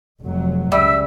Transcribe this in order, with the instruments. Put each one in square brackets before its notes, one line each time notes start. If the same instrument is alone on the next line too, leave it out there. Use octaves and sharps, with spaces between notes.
[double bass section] F1 F#3
[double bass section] C#2 [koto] G3 [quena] E5 [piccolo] E6